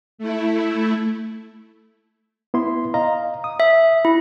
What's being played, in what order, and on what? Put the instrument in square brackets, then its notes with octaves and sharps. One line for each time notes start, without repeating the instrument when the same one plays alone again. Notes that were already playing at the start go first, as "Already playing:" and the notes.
[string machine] A3 E4
[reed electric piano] B3 E4 C6
D#5 F5 A#5
D#6
[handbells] E5
E4